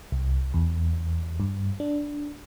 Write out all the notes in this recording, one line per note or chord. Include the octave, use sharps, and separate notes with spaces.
C2
E2
G2
D4